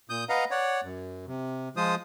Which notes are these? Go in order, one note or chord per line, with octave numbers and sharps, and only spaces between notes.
A#2 D#6 G6
B4 D#5 F5 F#5 A#5
C#5 D5 F#5
F#2
C3
F3 G#3 F4 C5 D#6